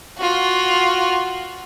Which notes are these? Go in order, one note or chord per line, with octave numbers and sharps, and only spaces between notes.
F4 F#4